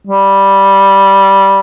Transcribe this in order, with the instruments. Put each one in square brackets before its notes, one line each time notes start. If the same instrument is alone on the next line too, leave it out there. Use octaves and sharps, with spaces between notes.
[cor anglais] G3